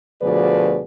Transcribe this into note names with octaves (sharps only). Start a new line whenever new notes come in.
D2 B2 F3 G#4 B4 D5